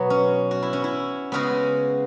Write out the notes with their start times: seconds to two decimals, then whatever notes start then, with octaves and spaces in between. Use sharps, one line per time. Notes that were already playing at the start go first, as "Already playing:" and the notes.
Already playing: B2 F#3 B3
0.10 C#4
0.51 F#4
0.62 E4
0.73 C#4
0.84 E4
1.32 C#3 G#3 B3 C#4 F#4